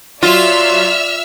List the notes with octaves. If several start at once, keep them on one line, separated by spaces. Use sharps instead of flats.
F#3 F4 D5 E5 C6 E6 F6